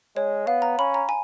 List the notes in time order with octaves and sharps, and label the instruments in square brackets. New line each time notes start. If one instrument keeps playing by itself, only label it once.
[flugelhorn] G#3 [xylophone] C#5
[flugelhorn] B3 [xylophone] F5
[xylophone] A#5
[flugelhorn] C#4 [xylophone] B5
[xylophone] A#5
G#5